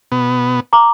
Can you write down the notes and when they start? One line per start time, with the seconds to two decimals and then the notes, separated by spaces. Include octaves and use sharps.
0.12 B2 B3
0.73 A#5 D6